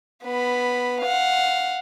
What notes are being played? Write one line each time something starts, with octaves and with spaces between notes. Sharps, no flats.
B3 B5
F5 F#5